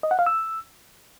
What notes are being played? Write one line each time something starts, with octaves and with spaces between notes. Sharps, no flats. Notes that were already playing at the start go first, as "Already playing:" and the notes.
D#5
F#5
F5
E6